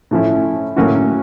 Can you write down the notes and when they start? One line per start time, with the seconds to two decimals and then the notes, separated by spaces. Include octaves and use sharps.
0.11 A2 F3 A3 C#4 E4
0.76 A2 F#3 A#3 C#4 F#4